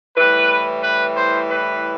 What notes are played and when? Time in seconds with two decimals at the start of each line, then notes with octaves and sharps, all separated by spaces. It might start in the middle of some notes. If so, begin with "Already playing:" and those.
0.16 A2 E3 G3 B4
0.83 B4
1.16 C5
1.49 B4